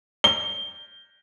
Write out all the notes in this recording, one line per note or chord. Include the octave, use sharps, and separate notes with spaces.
G7